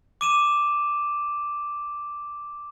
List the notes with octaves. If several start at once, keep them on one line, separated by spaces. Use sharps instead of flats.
D6 D#7 E7